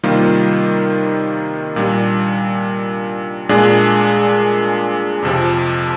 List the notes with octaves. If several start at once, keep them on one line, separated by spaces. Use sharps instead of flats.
C3 D#3 G3 A#3 F4
A#2 G3 D4
A#2 G#3 D4 G#4
F2 C3 F3